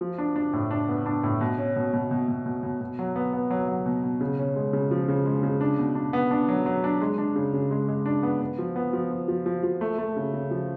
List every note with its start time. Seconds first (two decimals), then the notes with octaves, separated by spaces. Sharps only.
0.01 F3
0.18 D4
0.36 D4
0.53 A2
0.71 D4
0.88 B3
1.06 D4
1.23 A2
1.41 B2
1.58 C#4
1.76 B2
1.93 B2
2.11 B2
2.28 B2
2.46 B2
2.63 B2
2.81 B2
2.99 F#3
3.16 B3
3.33 B3
3.50 F#3
3.68 F#3
3.86 B2
4.03 B2
4.21 C#3
4.39 C#4
4.56 G#3
4.73 C#3
4.91 F3
5.08 C#3
5.26 G#3
5.43 C#3
5.61 D4
5.78 B2
5.95 D4
6.13 B3
6.31 D4
6.49 F#3
6.66 F#3
6.84 D4
7.02 G#3
7.18 D4
7.35 C#3
7.53 C#3
7.71 G#3
7.88 G#3
8.06 D4
8.23 B3
8.41 B3
8.58 F3
8.76 B3
8.93 F3
9.11 F3
9.28 F3
9.46 F3
9.63 F3
9.81 A3
9.98 A3
10.16 C#3
10.34 C#3
10.51 F3